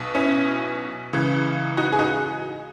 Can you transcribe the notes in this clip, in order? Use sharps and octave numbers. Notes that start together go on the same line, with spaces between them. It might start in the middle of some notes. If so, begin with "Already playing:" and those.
Already playing: B1 B2
C#4 E4
C#2 C#3 E3
D#4 F#4
G#4
D#4 F#4